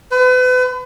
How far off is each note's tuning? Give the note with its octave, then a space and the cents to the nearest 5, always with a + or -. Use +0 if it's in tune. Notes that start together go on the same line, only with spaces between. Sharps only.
B4 +35